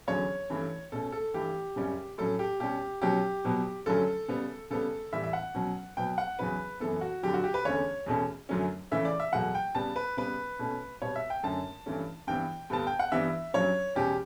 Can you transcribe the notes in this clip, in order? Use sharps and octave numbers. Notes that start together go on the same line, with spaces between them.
E2 D3 F#3 C#4 C#5
G2 E3 A3 C#4
B2 A3 C#4 A4
A4
G2 E3 A3 G4
F#2 C#3 G3 C#4
A2 F#3 C#4 A4
G4
B2 G3 C#4 G4
B2 F#3 C#4 G4
B2 F#3 B3
G2 D3 F#3 A3 C#4 A4
C#3 G3 B3
C#3 G3 B3 A4
A2 E3 G3 E5
E5
F#5
B2 F#3 C#4
B2 F#3 B3 G5
F#5
E2 C#3 F#3 C#4 B4
F#2 E3 B3 A4
F#4
G2 D3 F#3 G4
F#4
G4
B4
E2 D3 A3 C#4 C#5
E2 B2 A3 C#4
F#2 D3 F#3 A3 C#4
C#3 E3 A3 C#4 E5
D5
E5
E2 B2 F#3 A3 F#5
G5
C#3 G3 B3 A5
B4
C#3 G3 B3 B4
B2 A3 C#4
B2 G3 B3 C#5
E5
G5
F#2 D3 A3 C#4 A5
G2 E3 A3 C#4
G2 E3 B3 G5
G2 D3 G3 B3 A5
G5
F#5
G2 E3 G3 B3 E5
G2 F#3 C#4 C#5
E2 B2 G3 C#4 G4